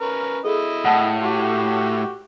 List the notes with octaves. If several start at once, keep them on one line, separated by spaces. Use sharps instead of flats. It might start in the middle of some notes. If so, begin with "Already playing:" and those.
C#4 A#4 B4
E4 G#4 A4 D#5
A2 F#5 A5
F#4 G4 D6